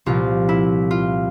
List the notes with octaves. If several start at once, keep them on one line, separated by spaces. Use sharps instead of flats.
C2 A#2 F3 F4
E4
F4